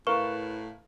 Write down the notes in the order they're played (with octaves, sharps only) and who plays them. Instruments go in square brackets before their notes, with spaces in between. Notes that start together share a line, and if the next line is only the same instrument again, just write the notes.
[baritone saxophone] A2 [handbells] E4 B4 [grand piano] A#4 F5 [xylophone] C#6